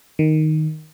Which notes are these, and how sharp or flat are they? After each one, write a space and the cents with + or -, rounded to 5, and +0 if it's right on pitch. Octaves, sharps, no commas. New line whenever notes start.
D#3 +0